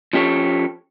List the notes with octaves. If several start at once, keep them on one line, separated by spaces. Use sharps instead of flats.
F3 C#4 G4 A4 C#5